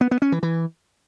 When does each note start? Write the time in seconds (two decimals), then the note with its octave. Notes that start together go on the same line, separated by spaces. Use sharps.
0.01 B3
0.11 B3
0.22 C#4
0.32 E3
0.43 E3